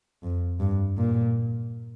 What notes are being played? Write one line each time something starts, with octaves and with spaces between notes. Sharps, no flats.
F2
G2
A#2